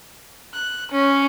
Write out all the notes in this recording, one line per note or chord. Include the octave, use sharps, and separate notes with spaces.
F#6
C#4